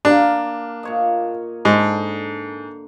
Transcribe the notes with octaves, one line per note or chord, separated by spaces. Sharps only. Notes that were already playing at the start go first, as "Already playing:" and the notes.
A#3 D4 A#4
A#2 C#5 D#5
G#2 D3 D6